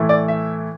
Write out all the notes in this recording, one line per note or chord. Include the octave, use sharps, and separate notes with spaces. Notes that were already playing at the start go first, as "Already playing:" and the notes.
Already playing: A2 E3 A3
D5
E5